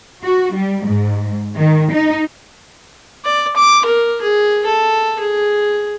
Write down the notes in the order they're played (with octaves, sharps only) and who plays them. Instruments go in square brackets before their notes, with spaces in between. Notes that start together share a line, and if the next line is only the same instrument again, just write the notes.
[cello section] F#4
G3
G#2
D#3
D#4
[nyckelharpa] D5
D6
A#4
G#4
A4
G#4